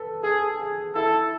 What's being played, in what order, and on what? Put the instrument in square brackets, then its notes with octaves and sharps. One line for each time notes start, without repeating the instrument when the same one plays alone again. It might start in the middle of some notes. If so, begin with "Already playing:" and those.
Already playing: [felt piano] A4 B4
[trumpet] G#4 [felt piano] A4
[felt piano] G#4
[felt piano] E4 [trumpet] A4